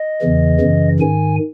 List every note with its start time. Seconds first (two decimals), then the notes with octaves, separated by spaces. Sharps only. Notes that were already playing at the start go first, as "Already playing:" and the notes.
Already playing: D#5
0.21 E2 C#3 E3
0.60 F#2 C#3 E3
1.00 G#2 D#3 G#5